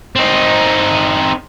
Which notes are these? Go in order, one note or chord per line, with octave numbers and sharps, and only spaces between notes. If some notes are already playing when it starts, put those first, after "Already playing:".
C4 D#4